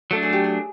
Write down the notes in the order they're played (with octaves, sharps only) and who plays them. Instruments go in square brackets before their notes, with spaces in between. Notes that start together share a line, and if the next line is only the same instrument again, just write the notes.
[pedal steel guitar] F#3 A3 D4 [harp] A4
[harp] G#4
G4
G#4